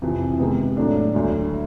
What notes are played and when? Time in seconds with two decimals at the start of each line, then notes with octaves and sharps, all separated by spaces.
0.02 F2 C3 E3
0.39 C3 D#3 G#3 B3
0.77 A2 F#3 A3 D4
1.14 D2 D3 F#3